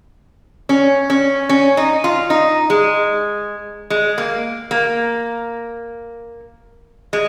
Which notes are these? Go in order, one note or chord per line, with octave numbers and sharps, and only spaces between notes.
C#4
C#4
C#4
D#4
F4
D#4
G#3
G#3
A#3
A#3
G#3